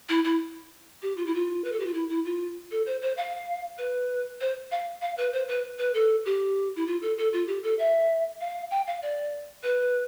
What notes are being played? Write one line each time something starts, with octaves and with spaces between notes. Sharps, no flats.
E4
E4
G4
F4
E4
F4
B4
A4
G4
F4
E4
E4
F4
A4
C5
C5
F5
B4
C5
F5
F5
B4
C5
B4
B4
A4
G4
E4
F4
A4
A4
F4
G4
A4
E5
F5
G5
F5
D5
B4